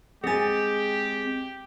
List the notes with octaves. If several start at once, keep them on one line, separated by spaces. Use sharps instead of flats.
G#3 C4 G4 G#4 G#5 A6